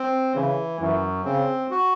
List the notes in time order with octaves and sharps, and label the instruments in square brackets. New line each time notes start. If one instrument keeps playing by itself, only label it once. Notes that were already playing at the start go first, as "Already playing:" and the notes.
Already playing: [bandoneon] C4
[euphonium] C#3 [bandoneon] E3
[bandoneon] F#2 [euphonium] E3
[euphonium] C#3 [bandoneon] C4
[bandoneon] F#4